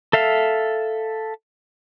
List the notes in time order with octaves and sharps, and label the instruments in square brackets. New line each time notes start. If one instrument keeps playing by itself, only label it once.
[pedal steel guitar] A4 E5 F5